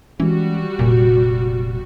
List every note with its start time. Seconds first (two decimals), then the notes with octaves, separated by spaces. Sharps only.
0.20 E3 G3 G#3 C#4 F#4
0.79 F1 A#2